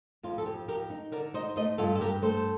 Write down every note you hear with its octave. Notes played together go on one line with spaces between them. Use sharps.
F2 F4
A4
F2 G4
F2 G4 A#4
D#4
D3 A#4 D5
D#4 C5 D#5
A3 C5 D#5
G2 F4 A4
A4
G2 G4 A#4
A3 A4 C5